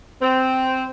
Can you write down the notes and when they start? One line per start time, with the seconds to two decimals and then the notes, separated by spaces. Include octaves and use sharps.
0.21 C4